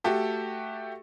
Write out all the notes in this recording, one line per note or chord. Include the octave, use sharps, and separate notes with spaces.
A3 F#4 G4 A4